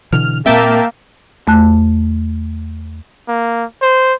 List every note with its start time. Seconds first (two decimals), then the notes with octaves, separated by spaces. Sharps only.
0.12 B2 D3 E3 F6
0.46 A#2 A#3 C4 E5 G5 A5
1.47 E2 A3 A5 F#6
3.28 A#3
3.82 C5